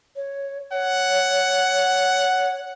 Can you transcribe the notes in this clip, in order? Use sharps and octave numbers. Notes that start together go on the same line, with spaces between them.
C#5
C#5 F#5